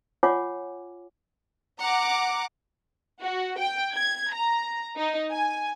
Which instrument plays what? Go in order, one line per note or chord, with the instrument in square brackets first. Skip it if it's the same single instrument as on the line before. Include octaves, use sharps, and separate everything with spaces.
[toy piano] F4 C#5 F#5 G#5 D6
[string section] F#5 A#5 D6
[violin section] F#4
G5
G#6
A#5
D#4
G#5